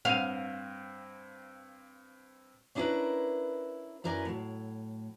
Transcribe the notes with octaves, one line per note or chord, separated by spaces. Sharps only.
G2 C4 F5 D#7
C#4 D4 E4 G#4 A#4 B4
F#2 E4 A#4 B4 D5 G#5
A2 F#3